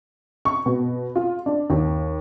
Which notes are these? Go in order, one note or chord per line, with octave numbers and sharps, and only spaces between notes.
C#6
B2
F4
D4
D#2